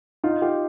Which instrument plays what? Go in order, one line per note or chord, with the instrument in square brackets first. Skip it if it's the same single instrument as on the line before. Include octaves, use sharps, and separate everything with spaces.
[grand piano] D#4 F4
F4 G4